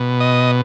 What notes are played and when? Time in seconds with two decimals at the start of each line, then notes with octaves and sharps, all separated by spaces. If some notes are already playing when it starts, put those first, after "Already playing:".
Already playing: B2
0.20 D#5